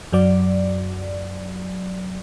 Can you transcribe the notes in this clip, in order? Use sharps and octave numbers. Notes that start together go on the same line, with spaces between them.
F#2 F#3 D5